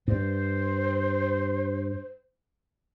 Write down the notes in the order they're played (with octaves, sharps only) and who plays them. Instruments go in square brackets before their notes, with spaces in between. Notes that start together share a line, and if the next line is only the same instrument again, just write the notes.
[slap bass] G2 [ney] C5